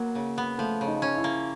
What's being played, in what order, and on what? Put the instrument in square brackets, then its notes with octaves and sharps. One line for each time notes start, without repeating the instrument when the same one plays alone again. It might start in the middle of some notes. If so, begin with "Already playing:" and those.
Already playing: [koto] F#3 B3 [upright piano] A#3
[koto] C#3
B3
[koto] F3 [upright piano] A3
[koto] C#3
[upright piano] D#4
[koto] C#4
[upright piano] E4
[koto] A#3